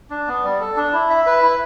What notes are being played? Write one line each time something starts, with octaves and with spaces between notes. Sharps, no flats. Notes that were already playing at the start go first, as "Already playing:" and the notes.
D4
B3
G3
A4
D4
E4
E5
B4
E4